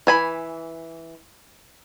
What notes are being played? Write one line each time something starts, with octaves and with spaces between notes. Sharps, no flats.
E3 G#5 B5